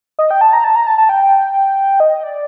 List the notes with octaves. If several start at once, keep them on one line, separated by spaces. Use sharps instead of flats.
D#5
G5
A5
A#5
A5
A#5
A5
A5
G5
D#5
D5